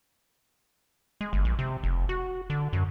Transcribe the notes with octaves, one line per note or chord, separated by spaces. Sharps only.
G#3
G1
A#1
C3
F1
F#4
D3
F#2